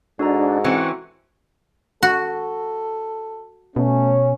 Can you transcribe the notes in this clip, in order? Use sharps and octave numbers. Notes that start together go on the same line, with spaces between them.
G#2 D4 F#4 A4 A#5
E3 C4 C#4 F#5
F#4 A4
B2 A3 C#4